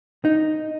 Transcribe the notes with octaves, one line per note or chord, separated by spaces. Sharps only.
D#4